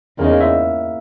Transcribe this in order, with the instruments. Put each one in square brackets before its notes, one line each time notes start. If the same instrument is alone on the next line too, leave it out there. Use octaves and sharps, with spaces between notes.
[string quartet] E2 C#3 G#3 D#4 [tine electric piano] A#3 A#4
[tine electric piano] A#3 A#4
E4 E5